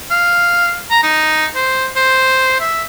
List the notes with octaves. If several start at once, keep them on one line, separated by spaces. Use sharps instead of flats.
F5
A#5
D#4
C5
C5
E5